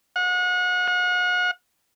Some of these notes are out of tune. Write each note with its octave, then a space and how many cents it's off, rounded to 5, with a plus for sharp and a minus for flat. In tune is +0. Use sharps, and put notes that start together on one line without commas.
F#5 -35
F#5 -40